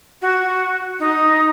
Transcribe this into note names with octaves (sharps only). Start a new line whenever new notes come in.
F#4
D#4